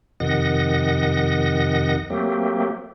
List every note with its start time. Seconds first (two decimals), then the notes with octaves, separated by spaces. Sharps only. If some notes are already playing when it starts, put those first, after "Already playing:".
0.20 F2 C3 D#3 D#5 F#5 A#6
2.10 F#3 A3 A#3 C4 G4